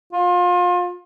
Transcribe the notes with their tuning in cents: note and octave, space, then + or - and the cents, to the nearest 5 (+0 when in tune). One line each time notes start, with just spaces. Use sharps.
F4 +30